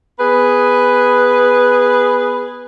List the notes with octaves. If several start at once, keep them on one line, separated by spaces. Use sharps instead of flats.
B3 G#4 B4